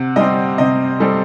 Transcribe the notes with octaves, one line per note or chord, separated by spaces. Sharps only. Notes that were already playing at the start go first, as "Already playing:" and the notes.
Already playing: C3 F#5
G3 C4 D#5
C3 D#5
G3 C4 A4